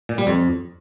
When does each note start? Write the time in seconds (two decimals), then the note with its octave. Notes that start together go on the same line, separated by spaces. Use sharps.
0.09 A#2
0.18 G3
0.27 F2